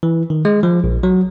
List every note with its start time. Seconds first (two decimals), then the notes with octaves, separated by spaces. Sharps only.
0.03 E3
0.30 D#3
0.45 G#3
0.63 F3
0.84 A#1
1.03 F#3